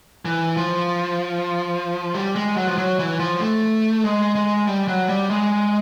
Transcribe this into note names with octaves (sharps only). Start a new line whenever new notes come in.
E3
F3
G3
G#3
F#3
F3
F#3
E3
F3
A3
G#3
G#3
G3
F#3
G3
G#3